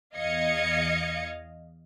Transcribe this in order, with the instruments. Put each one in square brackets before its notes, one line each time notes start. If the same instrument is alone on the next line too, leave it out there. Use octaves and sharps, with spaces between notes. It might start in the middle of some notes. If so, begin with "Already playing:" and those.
[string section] E2 D#5 F5 G#6 C#7